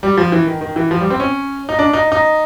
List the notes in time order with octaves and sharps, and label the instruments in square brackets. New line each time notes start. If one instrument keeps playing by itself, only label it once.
[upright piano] G3
F3
E3
D#3
D#3
E3
F3
G3
C4
C#4
D#4
D4
D#4
D#4